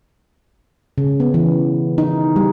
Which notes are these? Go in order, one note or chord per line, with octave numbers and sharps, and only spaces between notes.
C#3
B3
E3
D#4
G3